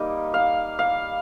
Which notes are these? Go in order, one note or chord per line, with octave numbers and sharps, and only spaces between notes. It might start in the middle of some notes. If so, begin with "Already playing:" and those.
Already playing: G3 A#3 D#4 D#5
F5
F5